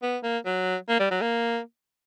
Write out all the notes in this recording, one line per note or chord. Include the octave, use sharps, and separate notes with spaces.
B3
A#3
F#3
A#3
G3
F#3
A#3